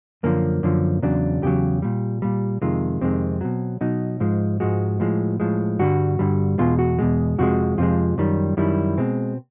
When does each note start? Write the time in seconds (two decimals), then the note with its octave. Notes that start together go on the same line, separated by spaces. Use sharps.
0.23 F#2 D3 F3 A#3
0.63 F#2 D3 F3
1.03 E2 C#3 F#3 D4
1.42 E2 C#3 F#3 G4
1.82 A#2 G3
2.22 A#2 G3
2.62 F2 C3 D#3 G#3 F4
3.01 F2 C3 D#3 G#3 C4
3.41 B2 F#3
3.81 B2 F#3 D#4
4.20 G#2 F3 G#3
4.60 G#2 F3 G#3 F#4
5.00 A2 F3 G#3
5.40 A2 F3 G#3
5.79 G2 D3 G3 F#4
6.19 G2 D3 G3
6.58 E2 B2 G#3 F4
6.79 F#4
6.99 E2 B2 G#3
7.38 F2 C3 F3 G#3 F#4
7.78 F2 C3 F3 G#3 F4
8.18 F#2 D#3 G3
8.57 F#2 D#3 G3 E4
8.97 B2 G#3 C4